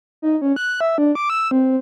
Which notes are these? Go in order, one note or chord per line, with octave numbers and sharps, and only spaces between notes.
D#4
C#4
F#6
E5
D4
D6
E6
C4